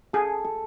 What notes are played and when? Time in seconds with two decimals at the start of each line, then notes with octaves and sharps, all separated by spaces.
0.13 G#4 A4
0.45 A4